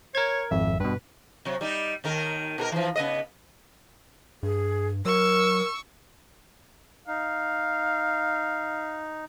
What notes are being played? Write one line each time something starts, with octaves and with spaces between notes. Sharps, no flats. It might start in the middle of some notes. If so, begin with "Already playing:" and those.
A#4 C#5 G#6
G#1 F2 E5
G2 B2 B4
C3 F#3
G3 D#4
D#2 D#3 A#4
B2 A4 A#4
E3 F3
C#3 B3 D#5
G2 G#4
F#3 A#4 C#6 E6
D#4 F5